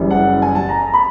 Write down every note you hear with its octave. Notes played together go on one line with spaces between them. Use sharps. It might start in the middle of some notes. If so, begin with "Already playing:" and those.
Already playing: F#1 F#2 C#3 E3 G3
F#5
G#5
A5
A#5
A#5
B5